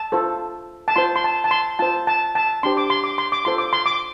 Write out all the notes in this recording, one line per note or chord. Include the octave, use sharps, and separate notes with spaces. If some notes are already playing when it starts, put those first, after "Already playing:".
Already playing: A5
F4 A4 C5
A5
F4 C5 C6
C6
A5
A5
C6
F4 C5 A5
A5
A5
D4 G4 C5 C6
D6
C6
D6
C6
D6
F4 A4 C5 C6
D6
C6
D6